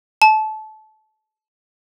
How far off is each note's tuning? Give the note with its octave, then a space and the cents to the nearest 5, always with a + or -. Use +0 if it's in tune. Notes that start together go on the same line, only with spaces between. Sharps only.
A5 -25